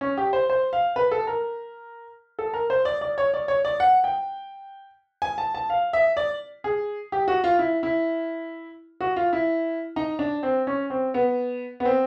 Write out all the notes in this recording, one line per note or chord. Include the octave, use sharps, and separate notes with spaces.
C#4
G4
C5
C5
F5
B4
A4
A#4
A4
A#4
C5
D5
D5
C#5
D5
C#5
D5
F#5
G5
G#5
A5
A5
F5
E5
D5
G#4
G4
F#4
F4
E4
E4
F#4
F4
E4
D#4
D4
C4
C#4
C4
B3
B3
C4